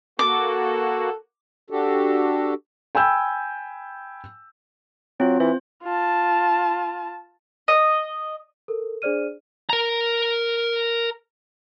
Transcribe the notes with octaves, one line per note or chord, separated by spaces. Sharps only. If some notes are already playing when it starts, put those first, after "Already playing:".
A#3 F#4 A4 D6
D4 F#4 G4 A4
G5 G#5 B5 E6 G6
F#3 C4 F4
E3 C5
F4 A5
D#5
A4 A#4
D4 G#4 C5 D5 F6 D#7
A#4 A#5